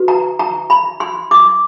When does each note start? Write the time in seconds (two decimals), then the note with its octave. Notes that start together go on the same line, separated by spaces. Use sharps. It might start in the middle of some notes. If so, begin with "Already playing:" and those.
Already playing: F#4 B4
0.08 A#5
0.39 A#5
0.70 B5
1.00 C6
1.31 D6